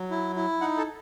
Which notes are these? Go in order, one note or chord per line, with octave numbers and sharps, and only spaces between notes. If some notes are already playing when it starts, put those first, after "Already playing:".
Already playing: F#3
E4
E4
D#4 F#5
A4